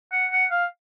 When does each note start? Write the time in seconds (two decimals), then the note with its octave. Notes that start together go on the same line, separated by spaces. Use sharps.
0.13 F#5
0.32 F#5
0.51 F5